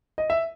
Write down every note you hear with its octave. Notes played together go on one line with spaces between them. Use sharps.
D#5
E5